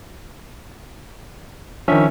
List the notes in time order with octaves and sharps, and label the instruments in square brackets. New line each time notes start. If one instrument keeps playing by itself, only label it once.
[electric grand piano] D#3 F3 [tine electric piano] C#4 E5 [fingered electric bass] D4